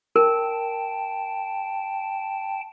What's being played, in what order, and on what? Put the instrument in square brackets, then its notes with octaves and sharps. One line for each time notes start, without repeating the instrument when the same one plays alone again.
[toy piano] A#4 [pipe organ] G5 A5